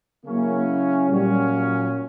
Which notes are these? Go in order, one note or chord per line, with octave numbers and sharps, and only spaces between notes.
C#3 F#3 A#3 C#4 E4
A#2 F#3 G3 C#4